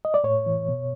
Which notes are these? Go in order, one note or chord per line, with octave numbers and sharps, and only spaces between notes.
D#5
D5
A2 C#5
E3
B2